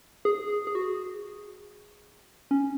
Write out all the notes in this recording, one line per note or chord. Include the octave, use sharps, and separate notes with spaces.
G#4
G#4
G#4
F#4
C#4